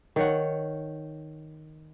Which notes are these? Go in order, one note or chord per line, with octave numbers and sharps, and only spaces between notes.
D#3 C#5 F#5